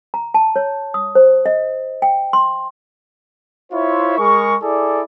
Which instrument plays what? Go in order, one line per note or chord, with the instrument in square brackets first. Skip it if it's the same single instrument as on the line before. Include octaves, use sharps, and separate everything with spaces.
[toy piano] A#5
A5
C#5
D#6
C5
D#5
G5
C6
[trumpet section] E4 F4 C5 C#5 E5
G#3 G#4 A#4 C#6
E4 G#4 A4 D5